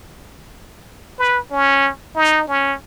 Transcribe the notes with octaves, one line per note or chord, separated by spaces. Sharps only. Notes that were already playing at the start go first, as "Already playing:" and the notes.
B4
C#4
D#4
C#4